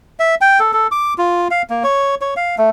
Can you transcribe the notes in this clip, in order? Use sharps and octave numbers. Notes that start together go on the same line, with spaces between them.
E5
G5
A4
A4
D6
F4
F5
A#3
C#5
C#5
F5
A3